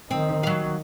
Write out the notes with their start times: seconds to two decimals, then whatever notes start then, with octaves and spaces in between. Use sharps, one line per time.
0.11 D#3 C4 D#4
0.43 F#3 F5